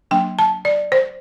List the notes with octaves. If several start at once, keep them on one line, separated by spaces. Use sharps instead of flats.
F#3 A#3 D4 G5
A5
D5
C5